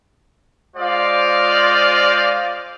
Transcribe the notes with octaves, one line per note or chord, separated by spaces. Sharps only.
G#3 F4 C5 D5 D#5 F5